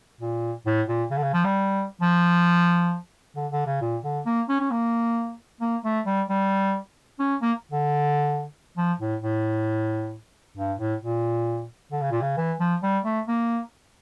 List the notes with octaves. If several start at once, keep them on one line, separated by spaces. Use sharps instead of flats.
A#2
A2
A#2
C#3
D3
C#3
F3
G3
F3
D3
D3
C#3
A#2
D3
A#3
C#4
C#4
A#3
A#3
A3
G3
G3
C#4
A#3
D3
F3
A2
A2
G2
A2
A#2
D3
C#3
A#2
C#3
E3
F3
G3
A3
A#3